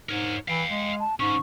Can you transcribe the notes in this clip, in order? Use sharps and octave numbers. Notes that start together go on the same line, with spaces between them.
G#2 A#4 C#5
E3 F5 G5
G#3
A5
G#2 D3 C#4 C#6